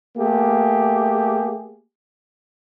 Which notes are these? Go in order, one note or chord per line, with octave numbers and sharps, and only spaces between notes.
A3 A#3 G4 G#4